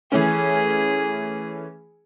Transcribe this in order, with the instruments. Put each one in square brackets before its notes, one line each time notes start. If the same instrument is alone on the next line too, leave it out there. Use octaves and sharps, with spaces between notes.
[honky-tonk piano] E3 A3 C#4 [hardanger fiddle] G#4